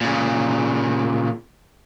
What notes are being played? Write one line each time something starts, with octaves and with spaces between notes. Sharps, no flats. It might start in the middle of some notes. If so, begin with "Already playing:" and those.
A#2 C#3